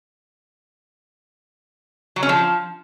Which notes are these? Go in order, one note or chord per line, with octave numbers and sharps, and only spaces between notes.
F#3
C#4
F3